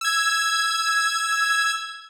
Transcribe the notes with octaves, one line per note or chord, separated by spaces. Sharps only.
E6 G#6